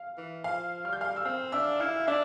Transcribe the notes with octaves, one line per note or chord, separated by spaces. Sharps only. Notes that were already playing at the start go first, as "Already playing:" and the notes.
Already playing: F5
E3
F3 F5 F6
G3 F6
G6
F5 F6
E6
C4 F5 F6
D4 E5 E6
E4 F5 F6
D4 E5 E6